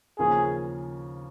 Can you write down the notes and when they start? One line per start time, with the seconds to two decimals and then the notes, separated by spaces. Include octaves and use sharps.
0.18 D#2 C#3 F3 A#3 C#4 G#4